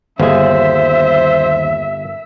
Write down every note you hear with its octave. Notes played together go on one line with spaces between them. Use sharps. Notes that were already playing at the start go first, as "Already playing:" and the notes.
G1 D#2 G#4 C5 E5